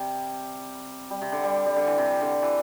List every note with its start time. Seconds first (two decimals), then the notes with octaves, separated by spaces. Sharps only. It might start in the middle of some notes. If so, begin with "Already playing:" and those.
Already playing: C3 G3
1.10 G3
1.22 C3
1.32 D3
1.43 G3
1.66 G3
1.76 D3
1.87 E3
1.98 C3
2.21 D3
2.43 E3